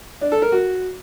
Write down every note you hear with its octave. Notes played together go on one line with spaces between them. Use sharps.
D4
A4
A#4
F#4